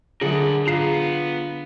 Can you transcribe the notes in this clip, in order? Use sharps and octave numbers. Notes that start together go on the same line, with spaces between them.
D3 F#3 D4 F4 G#4 A#4 F#5
B3 F4 G#4 A#5 C7 E7